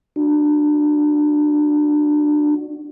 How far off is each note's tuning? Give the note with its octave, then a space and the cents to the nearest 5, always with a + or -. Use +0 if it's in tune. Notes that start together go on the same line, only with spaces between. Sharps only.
D4 +20 F#4 +0